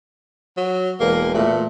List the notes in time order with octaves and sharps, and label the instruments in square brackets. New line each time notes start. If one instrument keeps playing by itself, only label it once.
[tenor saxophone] F#3
[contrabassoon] E1 [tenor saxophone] A#3
[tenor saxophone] A#2 [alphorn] A3